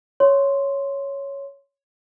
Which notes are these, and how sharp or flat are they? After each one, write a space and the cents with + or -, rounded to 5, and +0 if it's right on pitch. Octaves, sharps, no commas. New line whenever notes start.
C#5 +0 C6 +0